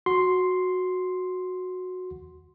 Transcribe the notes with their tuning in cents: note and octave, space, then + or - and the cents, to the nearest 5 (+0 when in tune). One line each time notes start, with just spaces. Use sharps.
F#4 -10 C6 +0